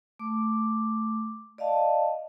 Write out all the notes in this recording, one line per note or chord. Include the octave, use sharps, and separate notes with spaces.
A3 D6
D5 D#5 F5 A5